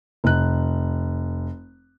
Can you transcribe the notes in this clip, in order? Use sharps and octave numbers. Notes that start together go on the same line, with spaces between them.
F1 F#6